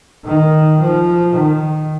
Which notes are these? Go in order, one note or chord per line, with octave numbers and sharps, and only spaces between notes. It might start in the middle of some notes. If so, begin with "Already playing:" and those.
D#3
F3
D#3